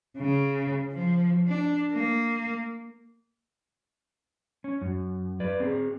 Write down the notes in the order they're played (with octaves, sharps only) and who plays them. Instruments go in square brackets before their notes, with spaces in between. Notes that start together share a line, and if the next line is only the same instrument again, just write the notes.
[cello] C#3
F3
D4
A#3
[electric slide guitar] C#4
F#2
B4 D5
C4 G#4